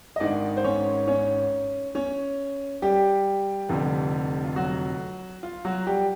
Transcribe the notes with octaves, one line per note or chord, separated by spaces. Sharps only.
D#5
G#1 G#2 D#3 D4 D5
C5
C#4 C#5
C#4 C#5
C#4 C#5
G3 G4
F1 F2 D3
F4
F#3 F#4
F4
F#3 F#4
G3 G4